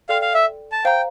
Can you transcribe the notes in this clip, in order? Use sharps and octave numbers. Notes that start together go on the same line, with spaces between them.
A4 D5 F5 G5 C6 F6
F5
E5
A5
C5 F5 G5 A#5